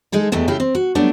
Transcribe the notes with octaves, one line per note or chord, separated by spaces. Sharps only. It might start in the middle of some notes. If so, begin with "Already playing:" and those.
G#3 D#4 G#4 A4
E2 E3 G#3 A3 G4
C#3 A3 E4 G4 F5
C4
F#4
F#3 G3 A3 B3 D4